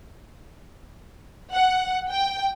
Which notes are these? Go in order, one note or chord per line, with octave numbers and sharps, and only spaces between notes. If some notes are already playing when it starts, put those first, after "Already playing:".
F#5
G5